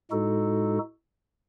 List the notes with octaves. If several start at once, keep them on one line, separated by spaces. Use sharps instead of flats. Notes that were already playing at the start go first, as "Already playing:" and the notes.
A2 G#3 D#4 F#4 A4